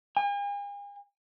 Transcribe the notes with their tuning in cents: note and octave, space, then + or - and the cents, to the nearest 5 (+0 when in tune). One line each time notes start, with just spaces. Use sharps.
G#5 -45